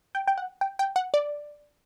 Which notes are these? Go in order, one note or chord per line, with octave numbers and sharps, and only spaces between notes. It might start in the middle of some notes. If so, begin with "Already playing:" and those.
G5
G5
F#5
G5
G5
F#5
D5